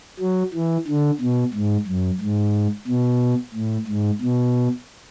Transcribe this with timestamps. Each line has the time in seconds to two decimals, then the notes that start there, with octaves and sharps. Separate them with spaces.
0.20 F#3
0.54 E3
0.87 D3
1.20 B2
1.54 G#2
1.87 F#2
2.21 G#2
2.87 B2
3.54 A2
3.87 G#2
4.21 B2